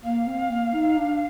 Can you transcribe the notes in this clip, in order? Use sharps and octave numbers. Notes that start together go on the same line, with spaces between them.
A#3 F5
C4
A#3
D#4
D4